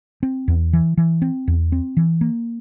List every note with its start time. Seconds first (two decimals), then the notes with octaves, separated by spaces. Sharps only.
0.23 C4
0.48 E2
0.73 E3
0.97 E3
1.22 C4
1.48 E2
1.72 C4
1.97 E3
2.21 A#3